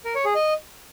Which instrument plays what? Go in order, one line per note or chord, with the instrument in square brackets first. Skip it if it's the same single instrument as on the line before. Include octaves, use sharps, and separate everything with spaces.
[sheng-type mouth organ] A#4
C#5
G#4
D#5